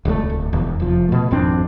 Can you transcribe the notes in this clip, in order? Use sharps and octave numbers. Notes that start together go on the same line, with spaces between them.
D1 C#2 C#3 A3
D1
E1 E2
F1 F3
B2 A3
G#1 F2 C4 D4